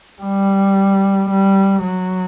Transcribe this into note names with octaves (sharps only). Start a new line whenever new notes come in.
G3
G3
F#3